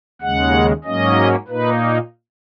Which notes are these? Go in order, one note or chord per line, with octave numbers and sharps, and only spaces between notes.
D#2 C#3 G#3 F#5
G#2 F#3 A#3 C#4 D#5
A#2 A#3 D#4 B4